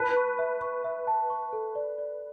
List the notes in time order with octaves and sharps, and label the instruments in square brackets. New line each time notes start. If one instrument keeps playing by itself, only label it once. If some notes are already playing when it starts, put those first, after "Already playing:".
Already playing: [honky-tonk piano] B4 [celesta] A5
[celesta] C#6
E5
C#6
E5
A5
C#6
A4
D5
D5